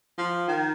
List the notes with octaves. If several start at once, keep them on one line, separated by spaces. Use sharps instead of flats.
F3
D#3